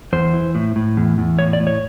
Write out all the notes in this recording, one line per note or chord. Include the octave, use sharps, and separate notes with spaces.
E2 C5
E3
A2
A2
E2
E2
A2 C#5
D5
A2
C#5